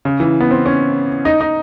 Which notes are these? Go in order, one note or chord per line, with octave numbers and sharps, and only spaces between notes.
C#3
E3
B3
C4
C#4
D#4
D#4